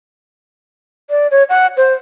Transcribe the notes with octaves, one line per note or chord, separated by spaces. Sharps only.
D5
C#5
F#5
C5